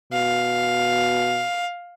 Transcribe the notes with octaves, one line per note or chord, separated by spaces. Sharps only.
B2 F5